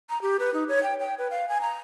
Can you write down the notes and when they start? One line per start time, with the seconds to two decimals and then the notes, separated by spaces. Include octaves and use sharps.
0.10 A#5
0.22 G4
0.39 B4
0.54 D#4
0.68 C#5
0.83 G5
1.00 G5
1.18 B4
1.30 F5
1.49 G#5
1.61 A#5